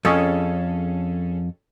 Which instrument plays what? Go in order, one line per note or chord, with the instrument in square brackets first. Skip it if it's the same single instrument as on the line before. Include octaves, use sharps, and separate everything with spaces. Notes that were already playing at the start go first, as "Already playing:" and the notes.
[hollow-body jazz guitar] F2 [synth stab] C#4 G#4 A4